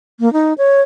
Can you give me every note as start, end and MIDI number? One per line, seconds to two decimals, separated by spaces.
0.20 0.32 58
0.33 0.53 63
0.58 0.81 73